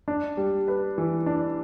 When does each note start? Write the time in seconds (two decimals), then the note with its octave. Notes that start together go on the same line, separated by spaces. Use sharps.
0.08 D4
0.37 G3
0.68 B4
0.98 E3
1.26 D4